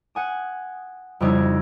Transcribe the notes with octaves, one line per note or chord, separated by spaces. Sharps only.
F#5 G#5 D#6
F2 C#3 G3 D#4 E4 G#6